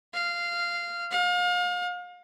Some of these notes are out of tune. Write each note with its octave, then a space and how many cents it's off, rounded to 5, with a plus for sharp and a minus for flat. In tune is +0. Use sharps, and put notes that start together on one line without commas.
F5 -10
F5 +35